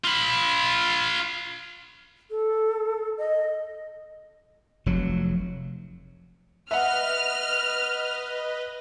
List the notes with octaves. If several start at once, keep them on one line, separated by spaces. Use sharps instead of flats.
F4 B5
A4
D#5
F1 F#3
B4 D#5 E5 F#5 F6